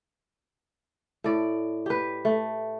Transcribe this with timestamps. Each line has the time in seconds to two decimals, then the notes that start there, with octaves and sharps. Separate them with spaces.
1.24 A2 D5
1.86 G4 B4
2.25 A3